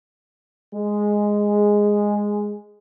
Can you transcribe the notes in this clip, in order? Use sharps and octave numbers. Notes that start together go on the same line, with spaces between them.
G#3 G#4